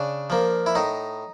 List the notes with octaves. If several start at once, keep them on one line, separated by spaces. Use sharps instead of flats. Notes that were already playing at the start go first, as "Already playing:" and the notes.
Already playing: C#3 D4
F3 A#3
E4
A2 D#4